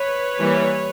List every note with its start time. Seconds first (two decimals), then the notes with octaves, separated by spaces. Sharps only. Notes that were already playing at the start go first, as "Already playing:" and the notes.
Already playing: B4 C#5
0.39 E3 G3 A#3